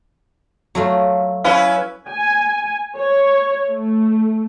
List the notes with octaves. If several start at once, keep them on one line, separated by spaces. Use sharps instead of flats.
F#3 A3 F4
C#4 E4 B4 F5
G#5
C#5
A3